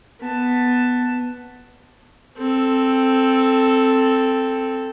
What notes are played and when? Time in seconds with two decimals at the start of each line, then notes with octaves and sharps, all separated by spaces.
0.21 B3 A5
2.38 C4 A4